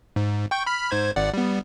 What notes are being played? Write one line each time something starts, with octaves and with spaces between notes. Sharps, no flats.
G#2
G5 C#6 G6
B5 F6 B6
G#2 C5 G#6
G#1 D5 F#5
G3 B3